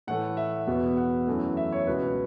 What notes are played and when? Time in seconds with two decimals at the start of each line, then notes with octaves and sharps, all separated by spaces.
0.07 A2 E3 A3 F#5
0.37 E5
0.67 E2 B2 B3
0.97 F#5
1.27 F#2 E3 A3
1.57 E5
1.72 C#5
1.87 C#2 B2 B3 B4